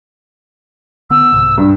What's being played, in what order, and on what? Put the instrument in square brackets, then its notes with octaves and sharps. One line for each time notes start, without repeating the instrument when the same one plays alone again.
[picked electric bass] D3 B3 [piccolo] E6
[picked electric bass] C2 G#2 C3
[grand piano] G2